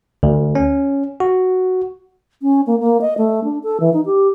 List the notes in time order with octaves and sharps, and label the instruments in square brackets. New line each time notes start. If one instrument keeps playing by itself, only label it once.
[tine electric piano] D2
C#4
F#4
[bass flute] C#4
A#3
A#3
D#5
A3
D4
A4
E3
D#4
G4